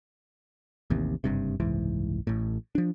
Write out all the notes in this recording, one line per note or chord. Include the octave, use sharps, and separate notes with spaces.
A1 D#2 C3
F#1 G2 C3
F#1 C2 G#2 E3
A1 A2
F3 D4